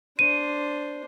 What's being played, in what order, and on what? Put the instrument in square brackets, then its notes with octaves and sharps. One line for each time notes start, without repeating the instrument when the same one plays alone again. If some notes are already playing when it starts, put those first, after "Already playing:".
[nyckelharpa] D4 C5 [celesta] D#7